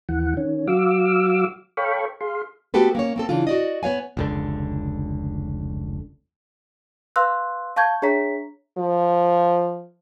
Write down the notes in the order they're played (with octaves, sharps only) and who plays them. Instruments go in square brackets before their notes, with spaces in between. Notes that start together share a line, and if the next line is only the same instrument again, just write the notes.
[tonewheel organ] D#2 E3 F#5
D#3 C#4
F#3 F#4 F5 D6 E6
A4 C#5 F5 G5 B5 C#6
G#4 F5 C6
[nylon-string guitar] A3 B3 F#4 G4 A4 B4
A#3 C#4 C#5
A#3 C4 A4
C#3 E3 D4 F4
F#4 D5 D#5
B3 C#5 F5 G#5
[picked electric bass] F1 C#2 D3
[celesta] B4 F5 C6 E6 F#6
F5 A5 C#6 G6 G#6
D4 G#4 C#5 E5 A#5 B6
[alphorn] F3